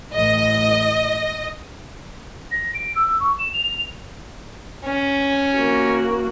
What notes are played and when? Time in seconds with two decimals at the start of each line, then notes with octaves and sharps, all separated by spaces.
0.14 A1 D#5
2.51 A#6
2.74 D7
2.96 E6
3.20 C#6
3.39 E7
3.53 F7
4.85 C#4
5.56 A#3 F#4